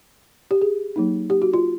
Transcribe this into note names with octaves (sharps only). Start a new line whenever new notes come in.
G4
G#4
F#3 A#3 D#4
G4
F#4
F4